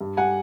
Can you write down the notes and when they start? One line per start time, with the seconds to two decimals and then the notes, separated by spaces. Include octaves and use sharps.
0.01 G2
0.17 G3 F#5 G#5